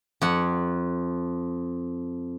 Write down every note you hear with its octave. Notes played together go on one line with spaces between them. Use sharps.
F2 F#5